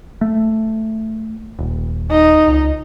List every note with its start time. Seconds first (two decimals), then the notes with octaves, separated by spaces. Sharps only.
0.21 A3
1.59 D#1
2.11 D#4
2.48 C#2